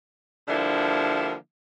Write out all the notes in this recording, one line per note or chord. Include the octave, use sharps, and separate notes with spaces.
D3 F3 G3 A#3 D4 E4